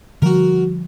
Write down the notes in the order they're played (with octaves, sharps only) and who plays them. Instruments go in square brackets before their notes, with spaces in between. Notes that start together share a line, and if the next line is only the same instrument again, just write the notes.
[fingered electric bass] D3 F3 G3 [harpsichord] F#4 A#4